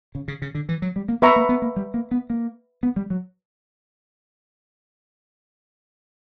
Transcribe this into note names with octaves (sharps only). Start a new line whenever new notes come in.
C#3
C#3
C#3
D3
E3
F#3
G3
A#3
B3 B4 E5 A#5 C#6
A#3
B3
A#3
G3
A#3
B3
A#3
B3
G3
F#3